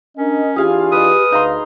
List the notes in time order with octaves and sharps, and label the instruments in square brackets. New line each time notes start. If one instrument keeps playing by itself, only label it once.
[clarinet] C#4 [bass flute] D4 [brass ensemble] A#4 D#5
[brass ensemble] E3 D4 F4 [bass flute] G4 [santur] G#4 F5 G#5
[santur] B4 D#5 [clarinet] D#6
[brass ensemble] D2 [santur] D#4 A#5 C6 [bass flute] F5